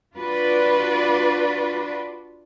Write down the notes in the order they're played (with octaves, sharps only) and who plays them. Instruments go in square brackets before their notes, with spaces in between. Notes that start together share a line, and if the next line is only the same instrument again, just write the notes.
[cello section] D4 F4 F#4 B4 D5